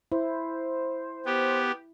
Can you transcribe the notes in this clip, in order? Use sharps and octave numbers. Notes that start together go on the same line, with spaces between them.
E4 C5
B3 G4